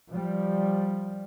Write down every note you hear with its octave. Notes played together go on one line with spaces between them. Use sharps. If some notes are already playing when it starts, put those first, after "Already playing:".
F3 G3